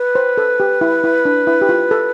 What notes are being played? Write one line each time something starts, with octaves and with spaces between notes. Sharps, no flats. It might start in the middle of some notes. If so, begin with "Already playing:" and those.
Already playing: B4
C5
A4
G4
E4
E4
D4
E4
G4
F4
A4